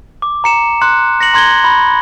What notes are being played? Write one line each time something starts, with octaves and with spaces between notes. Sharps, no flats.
D6
A#5 C#7 E7
C6 F#6 C#7
A#6 C#7 F#7
A#5 C6 G#6 A#6 G7
B5